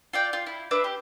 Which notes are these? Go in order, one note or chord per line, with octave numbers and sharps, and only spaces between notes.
F4 D5 G5
F4
E4
D4 B4 E5 D6
G4